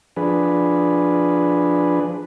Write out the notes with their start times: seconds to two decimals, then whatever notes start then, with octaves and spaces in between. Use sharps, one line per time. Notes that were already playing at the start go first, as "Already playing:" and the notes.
0.16 F3 D4 G#4 B4